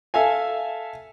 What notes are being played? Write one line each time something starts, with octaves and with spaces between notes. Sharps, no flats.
A4 E5 F5 G#5